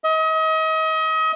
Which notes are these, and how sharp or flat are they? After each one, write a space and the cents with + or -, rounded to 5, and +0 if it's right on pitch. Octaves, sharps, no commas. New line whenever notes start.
D#5 +35